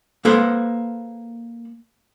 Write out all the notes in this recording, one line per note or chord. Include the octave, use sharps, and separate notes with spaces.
A#3 A4 B4 C5